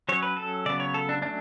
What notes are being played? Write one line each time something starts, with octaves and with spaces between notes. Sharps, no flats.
F#3 C#4 C#5
B4
A4
C#3 F#3 B3 D5
C#5
A4
D4
F#3 A3 C#4 D4